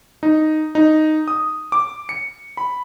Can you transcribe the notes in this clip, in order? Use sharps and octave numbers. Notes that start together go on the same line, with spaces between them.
D#4
D#4
D#6
D6
C#7
B5